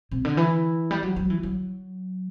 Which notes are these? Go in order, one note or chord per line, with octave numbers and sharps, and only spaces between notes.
C3
D3
E3
G3
F#3
F#3
E3
F#3